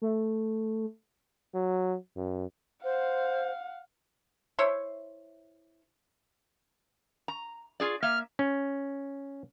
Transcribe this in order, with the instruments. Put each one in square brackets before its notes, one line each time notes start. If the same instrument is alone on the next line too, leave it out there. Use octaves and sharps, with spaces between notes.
[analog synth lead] A3
[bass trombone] F#3
F#2
[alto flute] C5 [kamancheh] F5 F#5
[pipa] E4 C5 C#5
[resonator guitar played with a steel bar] A#5
F4 G#4 D5
[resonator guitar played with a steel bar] A#3 E5 [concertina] F6
[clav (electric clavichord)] C#4